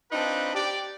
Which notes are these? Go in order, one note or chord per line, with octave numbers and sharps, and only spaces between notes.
C4 D4 D#4 F4 B4
G4 D5